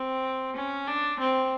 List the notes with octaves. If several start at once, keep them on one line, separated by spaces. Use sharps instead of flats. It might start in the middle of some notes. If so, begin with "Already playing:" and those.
Already playing: C4
C#4
D4
C4